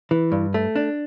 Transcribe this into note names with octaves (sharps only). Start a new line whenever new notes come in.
E3
G2
A3
D4